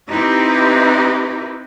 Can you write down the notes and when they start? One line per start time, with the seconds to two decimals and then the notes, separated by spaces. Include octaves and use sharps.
0.10 C4 D#4 E4 G4 B4